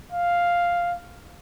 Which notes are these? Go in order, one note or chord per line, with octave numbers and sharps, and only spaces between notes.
F5